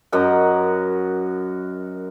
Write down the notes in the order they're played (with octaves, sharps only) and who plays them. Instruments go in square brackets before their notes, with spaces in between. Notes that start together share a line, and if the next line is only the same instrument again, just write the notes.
[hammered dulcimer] F#2 A#4 D#5 F#5